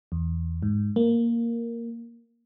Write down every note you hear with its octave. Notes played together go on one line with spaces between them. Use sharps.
E2
G#2
A#3